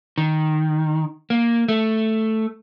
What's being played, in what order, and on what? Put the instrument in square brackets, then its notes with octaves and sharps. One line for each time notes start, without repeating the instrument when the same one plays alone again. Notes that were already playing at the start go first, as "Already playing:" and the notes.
[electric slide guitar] D#3
A#3
A3